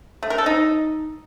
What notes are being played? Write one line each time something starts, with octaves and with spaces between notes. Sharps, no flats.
A3
A#4
A4
D#4